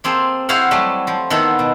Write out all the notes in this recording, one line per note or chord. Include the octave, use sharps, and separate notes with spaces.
A#3 C4 G#4 A4
E4 F#4 G#4 C5 F5 F#5
F#3 G3 A3
F3
D#3 B3 E4 F4 A4 F#5
B2